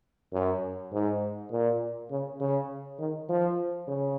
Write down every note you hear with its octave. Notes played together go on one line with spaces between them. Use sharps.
F#2
G#2
A#2
C#3
C#3
D#3
F3
C#3